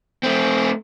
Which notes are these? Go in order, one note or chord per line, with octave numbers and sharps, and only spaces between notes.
A3 C4